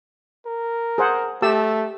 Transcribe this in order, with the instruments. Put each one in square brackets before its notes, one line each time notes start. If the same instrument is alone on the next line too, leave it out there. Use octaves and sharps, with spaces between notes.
[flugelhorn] A#4
[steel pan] G#4 C5 F#5
[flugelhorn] A3 [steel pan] G4 A5 E6